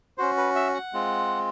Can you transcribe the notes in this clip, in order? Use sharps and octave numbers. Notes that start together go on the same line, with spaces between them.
C#4 F#4 C5
B4
E5
F#5
G#3 C4 F4